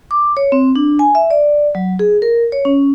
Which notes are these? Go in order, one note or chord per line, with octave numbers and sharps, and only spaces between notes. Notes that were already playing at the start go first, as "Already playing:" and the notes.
D6
C#5
C4
D4
G#5
E5
D5
F#3
G#4
A#4
C#5
C#4